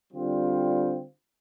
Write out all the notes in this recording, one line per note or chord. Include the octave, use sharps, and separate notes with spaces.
D3 G3 C4 F4